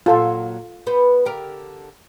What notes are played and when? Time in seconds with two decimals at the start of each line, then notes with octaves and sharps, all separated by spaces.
0.06 A#2 F#3 F4 A4
0.86 B3 B4 C5
1.25 D3 G4 A#4